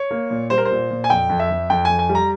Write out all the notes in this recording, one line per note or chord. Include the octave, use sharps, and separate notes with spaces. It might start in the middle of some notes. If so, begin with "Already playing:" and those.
Already playing: C#5
A#3
A#2
G3 C5
A#4
C5
A#2
A#2
G#5
F2 G5
F2
E5
F2
F2 G5
F2 G#5
G#5
G3
A#5